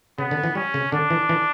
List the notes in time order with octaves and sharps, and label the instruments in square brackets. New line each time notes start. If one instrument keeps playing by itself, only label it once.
[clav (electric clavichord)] C#3 [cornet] B3
[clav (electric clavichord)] D3
E3
[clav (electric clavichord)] G3 [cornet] C#4
[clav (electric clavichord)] C#3
[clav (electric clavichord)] D3 [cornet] D4
[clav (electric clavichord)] E3
E3